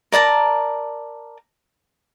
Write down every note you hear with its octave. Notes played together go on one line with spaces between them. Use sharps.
A#4 D5 A5 A#5